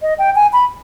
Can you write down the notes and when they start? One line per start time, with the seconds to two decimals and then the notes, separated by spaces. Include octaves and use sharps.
0.02 D#5
0.19 G5
0.35 G#5
0.53 B5